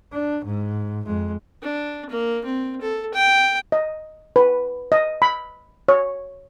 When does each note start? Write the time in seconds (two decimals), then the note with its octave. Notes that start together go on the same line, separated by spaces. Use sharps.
0.13 D4
0.45 G#2
1.05 F2 G#3
1.63 D4
2.10 A#3
2.45 C4
2.81 A4
3.14 G5
3.72 D#5
4.36 B4
4.92 D#5
5.22 B5
5.88 C#5